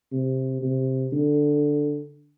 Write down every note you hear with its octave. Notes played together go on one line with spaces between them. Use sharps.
C3
C3
D3